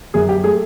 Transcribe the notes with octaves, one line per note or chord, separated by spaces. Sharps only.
F#2 G#4
G4
A3 G#4